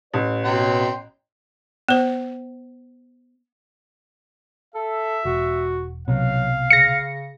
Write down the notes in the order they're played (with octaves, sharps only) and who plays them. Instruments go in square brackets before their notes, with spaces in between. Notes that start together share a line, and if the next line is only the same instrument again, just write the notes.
[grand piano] A1 [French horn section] C#5
[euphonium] B2 [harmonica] G5 A#5 C6
[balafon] B3 C5
[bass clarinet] A4 [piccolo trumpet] E5
[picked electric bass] E1 [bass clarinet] F#4
[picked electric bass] C2 B2 [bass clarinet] F#3 [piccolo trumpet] F5
[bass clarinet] C#3 [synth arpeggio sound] A#6 C#7